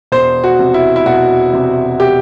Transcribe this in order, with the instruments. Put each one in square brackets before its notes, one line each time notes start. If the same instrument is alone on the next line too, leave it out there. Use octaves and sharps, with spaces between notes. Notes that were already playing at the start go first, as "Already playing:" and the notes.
[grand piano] E1 C5
F#4
C3
E4
E4
E1 F#4
C3
G4